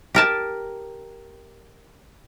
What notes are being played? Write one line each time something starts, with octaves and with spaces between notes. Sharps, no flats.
G4 A#4 A5